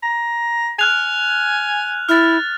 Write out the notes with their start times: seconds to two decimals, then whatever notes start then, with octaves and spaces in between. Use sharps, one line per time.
0.03 A#5
0.79 G#5 F6 F#6 F7
2.09 E4 F6 A6